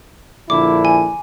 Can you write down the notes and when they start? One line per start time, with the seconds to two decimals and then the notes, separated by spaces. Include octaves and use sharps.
0.50 A#1 D3 E4 D6
0.85 G#5